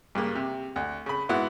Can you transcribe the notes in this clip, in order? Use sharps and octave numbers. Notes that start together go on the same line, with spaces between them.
G2 C#3 A#3
C3
D2
C#3 B5
G#2 B3 E4 F#4